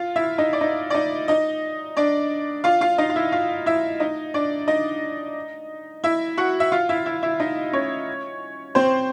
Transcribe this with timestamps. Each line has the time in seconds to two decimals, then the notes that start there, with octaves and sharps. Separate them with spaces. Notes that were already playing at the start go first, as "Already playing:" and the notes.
Already playing: F4 F5
0.16 E4 E5
0.38 D#4 D#5
0.53 D5
0.61 D#4 D#5
0.90 D5
0.95 D#4 D#5
1.28 D#4 D#5
1.97 D4 D5
2.64 F4 F5
2.81 F4 F5
2.98 D#4 D#5
3.10 F5
3.16 E4 E5
3.32 F4 F5
3.66 E4 E5
4.00 D#4 D#5
4.34 D4 D5
4.67 D#4 D#5
6.04 E4 E5
6.37 F#4 F#5
6.60 E5
6.72 F4 F5
6.89 E4 E5
7.06 E4 E5
7.23 E4 E5
7.40 D#4 D#5
7.73 C#4 C#5
8.75 C4 C5